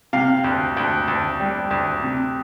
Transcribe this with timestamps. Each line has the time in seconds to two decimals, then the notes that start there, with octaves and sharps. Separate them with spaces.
0.13 C3 F5
0.44 D2
0.77 D2
1.08 D2
1.40 G3
1.71 D2
2.03 C3